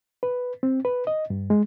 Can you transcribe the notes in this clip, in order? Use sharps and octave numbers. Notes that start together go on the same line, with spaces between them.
B4
C4
B4
D#5
G2
G#3